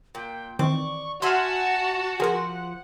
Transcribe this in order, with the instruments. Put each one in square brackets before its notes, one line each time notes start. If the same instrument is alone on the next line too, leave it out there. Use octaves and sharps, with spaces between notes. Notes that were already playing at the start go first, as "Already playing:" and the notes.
[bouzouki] A#2 [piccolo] G5
[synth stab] D#3 E3 C4 [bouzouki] D5 [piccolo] C#6
[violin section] F#4 [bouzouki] E5 F#5 G#5 [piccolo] A5 [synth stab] C6 E6 F6
[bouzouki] F3 C5 [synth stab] G#4 A#4 [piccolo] F#5